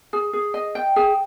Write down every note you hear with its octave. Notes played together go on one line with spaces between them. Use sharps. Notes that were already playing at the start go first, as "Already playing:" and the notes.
G#4
G#4
D#5
G5
G#4